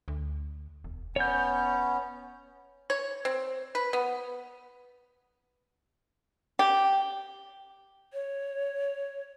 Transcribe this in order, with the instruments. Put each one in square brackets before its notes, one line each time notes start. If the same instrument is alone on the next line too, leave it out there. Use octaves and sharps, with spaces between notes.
[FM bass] D2
E1
[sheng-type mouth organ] B3 C#4 [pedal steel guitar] C#5 G6
[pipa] C#5
C4
B4
B3
G4
[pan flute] C#5